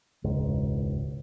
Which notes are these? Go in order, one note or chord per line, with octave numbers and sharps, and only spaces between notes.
E1 C#2 G#2